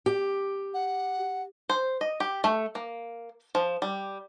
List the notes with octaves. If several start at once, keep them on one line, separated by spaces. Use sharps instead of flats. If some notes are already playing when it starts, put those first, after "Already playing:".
G4
F#5
C5
D#5
G4
A3
A#3
F3
G3